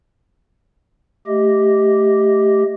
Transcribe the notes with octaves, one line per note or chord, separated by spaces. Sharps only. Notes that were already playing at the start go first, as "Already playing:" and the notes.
A3 G4 D#5